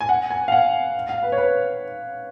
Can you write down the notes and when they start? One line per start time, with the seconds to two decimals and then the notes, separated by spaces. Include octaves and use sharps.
0.01 G#5
0.09 F#5
0.30 G#5
0.48 F5
0.52 F#5
1.09 F5
1.23 B4
1.32 C#5
1.38 B4